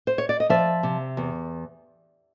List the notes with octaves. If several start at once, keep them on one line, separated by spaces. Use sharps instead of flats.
C5
C#5
D5
D#5
F3 D5 E5
C3
E2